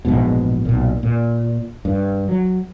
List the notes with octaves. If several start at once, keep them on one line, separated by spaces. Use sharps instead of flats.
A#1 E2 G#2 B2
B1 A#2
A#2
G2
F#3